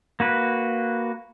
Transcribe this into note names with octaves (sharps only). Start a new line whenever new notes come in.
A#3 F#4 B4